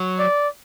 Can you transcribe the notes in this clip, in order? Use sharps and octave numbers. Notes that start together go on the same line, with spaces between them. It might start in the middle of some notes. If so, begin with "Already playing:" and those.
Already playing: F#3
D5